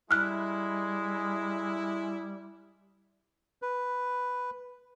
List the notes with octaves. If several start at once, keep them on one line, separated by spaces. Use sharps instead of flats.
G3 G#3 E4 F6 F#6
B4